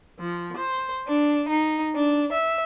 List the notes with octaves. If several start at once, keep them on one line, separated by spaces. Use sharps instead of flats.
F3
C5
D4
D#4
D4
E5